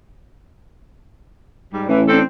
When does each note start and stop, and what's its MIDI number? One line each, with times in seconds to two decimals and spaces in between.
1.72 1.86 44
1.72 1.86 55
1.88 2.21 33
1.88 2.01 52
2.08 2.21 60
2.08 2.21 62
2.08 2.21 69